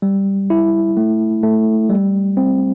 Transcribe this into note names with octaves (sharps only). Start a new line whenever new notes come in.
G3
E4
A3
A3
G3
C4